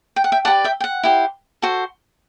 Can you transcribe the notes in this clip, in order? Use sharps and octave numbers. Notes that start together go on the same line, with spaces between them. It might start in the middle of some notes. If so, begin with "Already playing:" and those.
G5
F#5
E5 G5
G4 B4 D5 F#5 A5
E5 G5
G5
F#5
E4 G4 C5
F#4 A4 C5